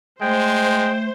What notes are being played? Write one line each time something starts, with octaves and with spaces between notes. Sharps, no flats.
G#3 A3 C5 G5